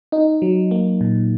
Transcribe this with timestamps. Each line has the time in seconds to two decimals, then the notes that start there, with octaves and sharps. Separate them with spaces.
0.12 D#4
0.42 F#3
0.71 A#3
1.01 A#2